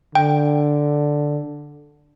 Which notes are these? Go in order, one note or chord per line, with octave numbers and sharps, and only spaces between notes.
D3 G5